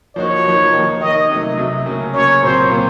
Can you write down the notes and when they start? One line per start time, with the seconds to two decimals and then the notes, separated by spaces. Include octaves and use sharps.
0.16 F3 A#3 D#4 F#4 C#5
0.44 F3 A#3 D#4 F#4
0.73 D#3 A#3 D#4
1.01 D#3 A#3 D#4 D#5
1.29 C3 F#3 A3
1.57 C3 F#3 A3
1.86 C#3 F#3 A#3 C#4
2.14 C#3 F#3 A#3 C#4 C#5
2.42 A#2 F#3 C4 F4 C5
2.71 A#2 F#3 C4 F4